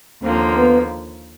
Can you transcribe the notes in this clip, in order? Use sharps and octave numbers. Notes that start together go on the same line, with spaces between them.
D#2 D3 F3 A#3 C4
B3